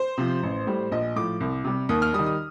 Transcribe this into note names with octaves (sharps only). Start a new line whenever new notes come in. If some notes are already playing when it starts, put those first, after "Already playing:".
Already playing: C5
C3 F3
A1
A2 G3
A#1 D#5
A2 F3 D6
C2
C3 G3
D#2 D#6
F6
G3 D#6
D#3
D#6